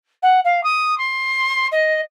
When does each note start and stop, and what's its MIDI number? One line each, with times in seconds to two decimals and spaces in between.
0.22 0.40 78
0.44 0.63 77
0.63 0.97 87
0.97 1.67 84
1.72 2.01 75